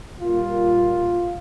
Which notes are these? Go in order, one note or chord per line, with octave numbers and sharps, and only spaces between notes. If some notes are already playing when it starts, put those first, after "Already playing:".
A#2 G3 A#3 F4